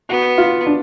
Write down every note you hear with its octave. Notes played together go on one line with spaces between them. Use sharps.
B3 F#4
F4
D4